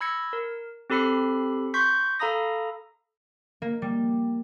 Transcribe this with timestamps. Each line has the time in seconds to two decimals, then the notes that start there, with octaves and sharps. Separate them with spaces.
0.01 B5 E6 G#6 A#6 C#7
0.33 A#4
0.90 C4 G4 A4 B5 C7 C#7
1.74 C6 C#6 G6 B6
2.20 A4 F5 A#5 B5 D#6 A#6
3.62 A#3
3.82 G3